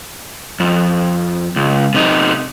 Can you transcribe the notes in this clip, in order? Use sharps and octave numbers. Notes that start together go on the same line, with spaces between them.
F2
C#2
C3 D#4